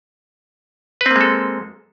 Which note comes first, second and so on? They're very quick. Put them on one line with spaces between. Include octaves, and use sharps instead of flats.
B4 C4 A#3 G#3 A4